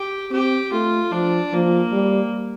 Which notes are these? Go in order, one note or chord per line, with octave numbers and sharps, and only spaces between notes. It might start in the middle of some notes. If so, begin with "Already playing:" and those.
Already playing: G4
C4 G4
A3 F4
F3 D4
F3 A#3
G3